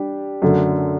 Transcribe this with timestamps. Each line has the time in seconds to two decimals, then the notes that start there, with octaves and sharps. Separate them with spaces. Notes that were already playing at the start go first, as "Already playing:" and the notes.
Already playing: G3 D4 G4
0.42 F#2 D3 A3